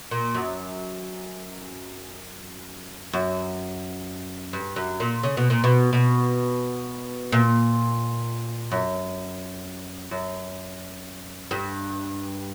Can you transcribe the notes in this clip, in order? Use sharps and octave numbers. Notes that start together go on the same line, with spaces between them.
A#2
F#2
F#2
G2
F#2
A#2
C#3
B2
A#2
B2
B2
A#2
F#2
F#2
G2